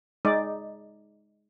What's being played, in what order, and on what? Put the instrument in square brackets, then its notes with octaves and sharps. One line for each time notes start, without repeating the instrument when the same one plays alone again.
[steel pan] G#3 D#4 D5